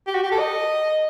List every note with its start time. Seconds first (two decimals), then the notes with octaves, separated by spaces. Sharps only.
0.07 G4
0.14 F#4
0.23 G4
0.32 A4
0.39 D#5